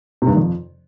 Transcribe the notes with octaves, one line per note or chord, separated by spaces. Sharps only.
C3
G2
D#3
F2